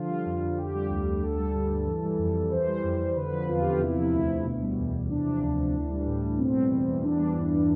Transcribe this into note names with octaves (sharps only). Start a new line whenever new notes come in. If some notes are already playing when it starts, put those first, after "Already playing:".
Already playing: D3 F3 F4
G3
F2
F2
D3 G4
G3
D2
D2
D3 A4
G3
G2
G2
E3
G3
F2
F2
E3 C5
G3
F2
F2
D3 B4
F3
E2 F4
E2 G4
F4
C3 E4
F3
E4
D2
D2
B2
G3
E2
E2
C3 D4
F3
D2
D2
E3
G3
A2
A2
B2 C4
G3
E2
E2
E3 D4
G3
G2